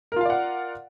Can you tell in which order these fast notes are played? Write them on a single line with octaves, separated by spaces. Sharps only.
A#4 F4 F5 D5 F#5